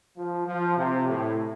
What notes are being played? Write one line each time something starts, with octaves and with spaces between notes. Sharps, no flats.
F3
F3
C3
A2